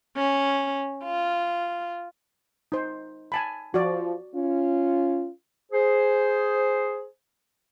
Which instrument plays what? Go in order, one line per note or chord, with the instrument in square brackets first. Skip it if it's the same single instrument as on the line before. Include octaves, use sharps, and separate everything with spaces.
[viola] C#4
F4
[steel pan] D#4 C5
G#5 A5 B5
[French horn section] F3 [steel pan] F#4 D5
[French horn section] C#4 F4
[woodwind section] G#4 C5